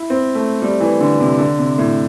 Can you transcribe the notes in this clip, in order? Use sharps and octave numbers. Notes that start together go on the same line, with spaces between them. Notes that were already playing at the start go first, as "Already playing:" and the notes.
Already playing: E4
C4
A3
G3
E3
D3
C3
D3
C3
A2